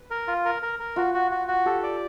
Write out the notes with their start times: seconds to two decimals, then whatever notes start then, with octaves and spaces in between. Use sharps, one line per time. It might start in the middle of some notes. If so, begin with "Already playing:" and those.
Already playing: B4
0.10 A#4
0.28 F4
0.45 A#4
0.62 A#4
0.79 A#4
0.96 F4 F#4
1.14 F#4
1.31 F#4
1.48 F#4
1.66 G4 A4
1.83 D5